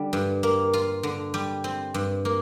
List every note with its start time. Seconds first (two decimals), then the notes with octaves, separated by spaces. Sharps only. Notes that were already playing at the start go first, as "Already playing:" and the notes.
Already playing: D3 G3
0.13 G2
0.43 A#3
0.73 F4
1.03 D3
1.34 G3
1.64 C4
1.94 G2
2.25 A#3